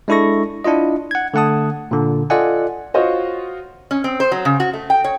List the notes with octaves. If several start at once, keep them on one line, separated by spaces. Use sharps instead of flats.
G#3 D4 E4 A4 C#6 A#6
D4 E4 F4 D#5
F#5 G#6
D3 A3 F#5 A5 D#6
A#2 D3
F4 A4 D5 D#5 F#5 G#5
F4 F#4 C5 C#5 D#5
C#4
C4
C5
F#3
C#3
F#4
A3
G5
C#5